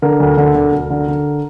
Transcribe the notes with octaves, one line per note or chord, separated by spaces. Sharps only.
D3 A#4
D2
D3
D2
D2
D3
D3